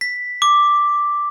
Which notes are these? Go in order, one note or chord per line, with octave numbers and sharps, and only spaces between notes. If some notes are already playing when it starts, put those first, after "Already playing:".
B6
D6